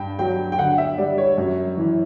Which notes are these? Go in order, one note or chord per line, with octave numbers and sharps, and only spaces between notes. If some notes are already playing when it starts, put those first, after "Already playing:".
Already playing: G2 G5
F#3 G5
G5
D3 F#5
E5
G3 D5
C#5
F#2
E3